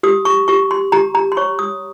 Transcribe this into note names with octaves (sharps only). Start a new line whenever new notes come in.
G4 D#6
C#6
G4 C#6
C6
G4 A#5
A#5
C6
C#5 C#6
D#6